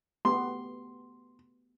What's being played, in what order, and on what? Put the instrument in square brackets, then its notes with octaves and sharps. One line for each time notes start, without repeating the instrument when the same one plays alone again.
[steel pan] A3 B3 G4 [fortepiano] C6